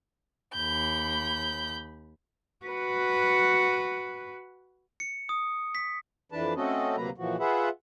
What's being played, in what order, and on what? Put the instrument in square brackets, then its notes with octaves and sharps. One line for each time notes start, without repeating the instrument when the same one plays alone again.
[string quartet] D#2 B5 G6
[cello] F#4 B4
[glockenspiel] C#7
D#6
B6
[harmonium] F2 E3 D4 B4 A5
A3 C4 C#4 F#4 A4 D#5
D2 C3 F#3 A#3 B4 A#5
A#2 E3 F3 F#4
F4 G#4 B4 E5 F#5